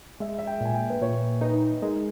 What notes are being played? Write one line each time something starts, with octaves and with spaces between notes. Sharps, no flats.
G#3 E5
E5
G5
A#2 G#5
G5
B4
A#2 C#5
D#4 B4
G#3 A#4